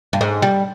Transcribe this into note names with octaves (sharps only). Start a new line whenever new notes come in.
G2
G#2
G3